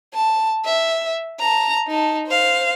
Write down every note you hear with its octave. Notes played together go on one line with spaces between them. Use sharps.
A5
E5
A5 A#5
D#4 A5
C5 F5